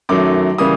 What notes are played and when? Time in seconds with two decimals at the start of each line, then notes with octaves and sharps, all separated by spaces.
0.09 F#2 D#3 F#3 A3 D6
0.58 C#3 E3 G3 A#3 D#6